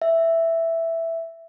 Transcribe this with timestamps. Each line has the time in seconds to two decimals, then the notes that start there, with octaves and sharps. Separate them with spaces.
0.02 E5